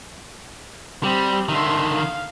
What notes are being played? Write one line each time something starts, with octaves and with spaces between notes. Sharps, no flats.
G3 C4 G4
D3 D#3 E5 C6
F5